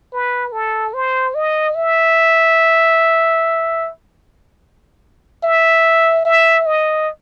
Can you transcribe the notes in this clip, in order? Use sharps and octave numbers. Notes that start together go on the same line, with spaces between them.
B4
A4
C5
D#5
E5
E5
E5
D#5